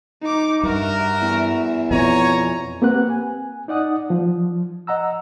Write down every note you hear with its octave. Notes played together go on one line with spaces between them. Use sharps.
D#4 D6
G2 F#4 A#4 E5
E2
F2 B2 C#5 G#5 A#5
A#3 C4 G4 B4 F#5 F#6
G#5
D#4 D5 F#5 D#6
F3
D#5 F#5 A#5 E6